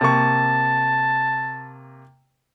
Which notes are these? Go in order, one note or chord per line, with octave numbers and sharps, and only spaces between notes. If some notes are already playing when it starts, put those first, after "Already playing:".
C3 A#3 A5 C#6